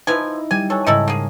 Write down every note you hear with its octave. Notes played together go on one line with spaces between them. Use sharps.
F3 D#4 E4 B4 G#5
G3 G#5
A4 C#5 G#5 F#6
G#2 C#3 D#4 E4 A4
A#3 G#4